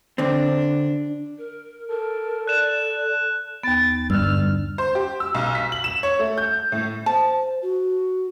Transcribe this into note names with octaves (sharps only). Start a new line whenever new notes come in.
D3 C4 D4
A#4
A4 A#4
D5 F#6 E7
D#2 B3 A6
G2 D3 E6 F6
C5
G4
E6
B1
B6
F#7
E7
C#5
A3
G6
A2
C5 A5
F#4